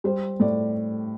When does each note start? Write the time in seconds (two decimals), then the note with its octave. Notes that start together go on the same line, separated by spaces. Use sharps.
0.04 G3 C5
0.40 A2 D5